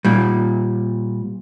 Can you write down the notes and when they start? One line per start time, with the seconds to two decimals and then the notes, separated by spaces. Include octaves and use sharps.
0.05 A#2 G3